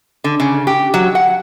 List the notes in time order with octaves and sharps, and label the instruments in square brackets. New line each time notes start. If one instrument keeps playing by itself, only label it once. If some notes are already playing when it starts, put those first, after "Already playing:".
[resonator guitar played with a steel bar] D3
C#3
G4
F#3
F#5